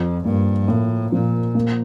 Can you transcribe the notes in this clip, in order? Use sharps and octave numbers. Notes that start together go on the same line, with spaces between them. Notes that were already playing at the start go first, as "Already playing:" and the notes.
Already playing: F2 F3
G2 A#3
A2 A#3
A#2 F3
A#3